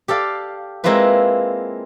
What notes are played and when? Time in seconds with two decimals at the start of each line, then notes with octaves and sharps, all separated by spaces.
0.08 G4 A4 D5 F5
0.84 G#3 A#3 C4 E4 F4 B4